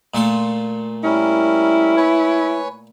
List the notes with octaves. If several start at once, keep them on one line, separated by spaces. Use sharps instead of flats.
A#2 A3 C6
G3 C#4 E4 A#4
B4 C#5 G#5